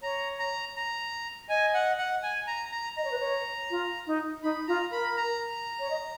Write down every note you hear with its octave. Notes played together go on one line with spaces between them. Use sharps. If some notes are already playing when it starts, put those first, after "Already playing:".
C#5 A#5
A#5
A#5
D#5 G#5
F#5
F#5
G#5
A#5
A#5
D#5 A#5
C#5
B4
C#5
F4
D#4
D#4 B5
F4 A#5
A#4 B5
A#5
C#5
D#5